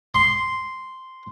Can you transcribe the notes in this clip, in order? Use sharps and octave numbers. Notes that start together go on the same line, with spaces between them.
C6